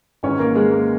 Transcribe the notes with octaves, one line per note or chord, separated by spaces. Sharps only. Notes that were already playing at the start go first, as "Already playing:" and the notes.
G#1 G#2 E3 C#4 C#5
A#3 A#4
G#3 G#4
A#3 A#4